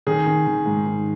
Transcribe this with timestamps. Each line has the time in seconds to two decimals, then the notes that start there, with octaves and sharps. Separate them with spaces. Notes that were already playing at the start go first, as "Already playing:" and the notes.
0.07 D#3 G#4
0.26 D#3
0.47 D#3
0.66 G#2
0.86 D#3